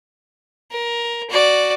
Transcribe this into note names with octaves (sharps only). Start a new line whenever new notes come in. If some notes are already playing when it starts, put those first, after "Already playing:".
A#4
F#4 D5